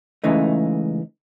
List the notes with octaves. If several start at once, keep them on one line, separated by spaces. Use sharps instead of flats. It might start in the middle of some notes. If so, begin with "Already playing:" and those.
C#2 C#3 E3 A3 D#4